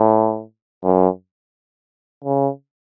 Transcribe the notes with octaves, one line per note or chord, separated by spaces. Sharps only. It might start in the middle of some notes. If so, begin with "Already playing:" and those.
Already playing: A2
F#2
C#3